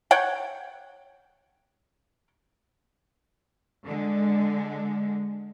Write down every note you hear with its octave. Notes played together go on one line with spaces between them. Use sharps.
C#5 F#5 G5
D3 G#3